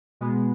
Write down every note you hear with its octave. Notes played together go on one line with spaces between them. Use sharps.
B2 G#3 B3